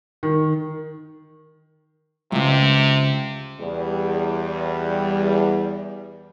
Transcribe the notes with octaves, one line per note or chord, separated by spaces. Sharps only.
D#3
C#2 F#2 C3
E2 G3